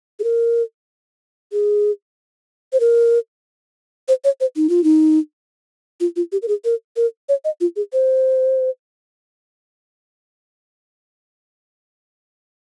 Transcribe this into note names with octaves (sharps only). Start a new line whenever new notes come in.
G#4
A#4
G#4
C5
A#4
C5
C#5
C5
D#4
F4
D#4
F4
F4
G4
A#4
G#4
A#4
A#4
C#5
D#5
F4
G#4
C5